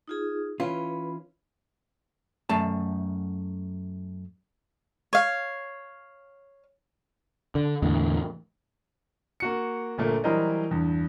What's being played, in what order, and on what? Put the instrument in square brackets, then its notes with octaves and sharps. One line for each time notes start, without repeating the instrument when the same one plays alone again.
[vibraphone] D#4 F4 G#4
[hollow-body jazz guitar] E3 C#4 F4 [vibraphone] B4 B5
[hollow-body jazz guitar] F#2 A3 A5
[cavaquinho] C#5 F5
[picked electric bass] D3
E2 A2 D3
[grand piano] A#3 F#4 C#7
G1 A#2 A3 A#3
E3 F#3 G3 A#4 C5 D#5
E2 G2